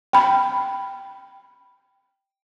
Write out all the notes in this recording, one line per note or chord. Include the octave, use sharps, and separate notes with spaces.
G5 B5